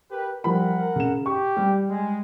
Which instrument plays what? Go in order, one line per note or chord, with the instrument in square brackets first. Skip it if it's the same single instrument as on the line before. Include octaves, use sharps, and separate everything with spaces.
[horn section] G4 A#4 B4
[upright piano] F3 G3 B5 [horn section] A#4 F#5
[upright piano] C#3 E7
[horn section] G4 [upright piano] C#6
[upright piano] G3
[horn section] G#3